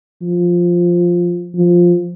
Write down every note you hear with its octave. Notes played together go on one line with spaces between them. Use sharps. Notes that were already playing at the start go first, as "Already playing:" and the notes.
F3
F3